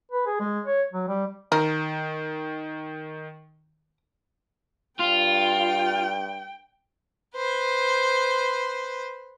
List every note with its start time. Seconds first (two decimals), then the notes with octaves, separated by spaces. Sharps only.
0.11 B4
0.26 G#4
0.40 G#3
0.65 C#5
0.93 F#3
1.08 G3
1.52 D#3 A#4
5.00 G2 F4 G5
7.36 B4 C5